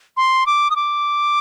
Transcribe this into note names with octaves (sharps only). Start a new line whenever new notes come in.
C6
D6
D#6
D6